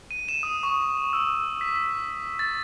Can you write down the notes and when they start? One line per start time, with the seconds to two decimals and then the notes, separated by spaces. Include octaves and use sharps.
0.11 D#7
0.29 E7
0.43 D#6
0.63 C#6
1.13 E6
1.61 B6
2.39 A6